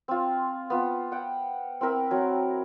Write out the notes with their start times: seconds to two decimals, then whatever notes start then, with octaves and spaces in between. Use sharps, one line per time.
0.08 C4 F4
0.70 B3 F4
1.12 F#5 G5
1.81 C4 E4 A#4 B5
2.11 F#3 C4